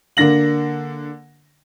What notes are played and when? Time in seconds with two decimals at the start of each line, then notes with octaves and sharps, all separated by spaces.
0.17 D3 A#3 D4 A#6 F#7